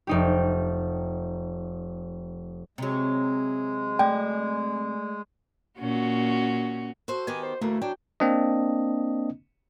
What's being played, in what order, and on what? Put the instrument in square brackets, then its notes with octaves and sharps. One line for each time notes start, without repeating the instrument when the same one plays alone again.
[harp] F1 D#4 G4
[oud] C3 F#3 [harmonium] G#3
[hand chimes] A3 D5 G#5 [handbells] G5
[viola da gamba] A#2 C#4 F#4
[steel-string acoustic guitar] F#4 A4 C5
[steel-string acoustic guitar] D#3 B3 G4 [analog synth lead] G#5
[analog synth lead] C5
[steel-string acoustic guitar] D2 E3 A#3 [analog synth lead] A3
[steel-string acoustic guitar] F#3 D4 [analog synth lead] G5
[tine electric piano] A#3 C4 D4 D#5